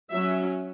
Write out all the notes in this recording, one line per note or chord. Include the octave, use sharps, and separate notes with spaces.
F#3 C#4 E5